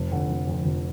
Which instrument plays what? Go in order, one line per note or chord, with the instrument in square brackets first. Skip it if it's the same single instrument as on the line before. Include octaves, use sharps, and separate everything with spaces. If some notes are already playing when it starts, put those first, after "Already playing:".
Already playing: [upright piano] F1
F2 D3
F1
F2 D3
F1